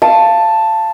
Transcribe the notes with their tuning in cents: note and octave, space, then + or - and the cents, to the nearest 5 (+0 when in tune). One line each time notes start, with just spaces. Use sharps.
F5 -20 A5 +5